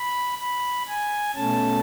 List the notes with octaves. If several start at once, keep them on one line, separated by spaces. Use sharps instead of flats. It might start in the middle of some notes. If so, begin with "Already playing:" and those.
Already playing: B5
B5
G#5
B2 A3 C#4 A5